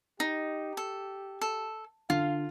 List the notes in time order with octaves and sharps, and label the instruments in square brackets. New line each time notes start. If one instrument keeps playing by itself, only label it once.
[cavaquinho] D#4 [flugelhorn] G4
[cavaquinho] A4
A4
[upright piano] D3 [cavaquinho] F4 [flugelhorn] F5